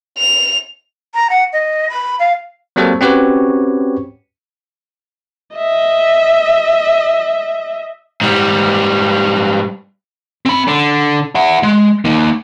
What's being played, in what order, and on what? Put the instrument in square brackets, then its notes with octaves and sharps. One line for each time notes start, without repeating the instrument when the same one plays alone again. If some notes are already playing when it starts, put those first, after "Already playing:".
[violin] F7
[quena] A#5
F#5
D#5
B5
F5
[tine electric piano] F#3 G3 A#3 C4 A4 C#5
C4 C#4 F#4 G4 B4 C#5
[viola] D#5 E5
[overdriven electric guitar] G#2 G3
C4 B5
D3
E4 F#5
G#3
A#3 D#4